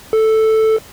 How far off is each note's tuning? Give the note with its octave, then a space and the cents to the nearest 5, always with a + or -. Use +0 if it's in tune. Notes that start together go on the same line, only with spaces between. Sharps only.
A4 +0